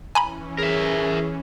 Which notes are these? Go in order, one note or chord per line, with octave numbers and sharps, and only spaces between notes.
E3 C#4 G#5 A#5 B5
G#4 A#4 E5